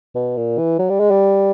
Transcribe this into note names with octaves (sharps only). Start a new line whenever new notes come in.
B2
A#2
E3
F#3
G3
G#3
G3